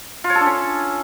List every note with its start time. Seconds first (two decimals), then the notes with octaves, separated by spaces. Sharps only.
0.24 F4
0.30 C#5
0.35 A4
0.41 D4
0.46 C#4